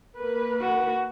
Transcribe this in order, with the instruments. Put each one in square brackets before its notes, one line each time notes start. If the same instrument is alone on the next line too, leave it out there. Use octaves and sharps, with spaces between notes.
[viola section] A#3 A#4 B4
[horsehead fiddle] F#4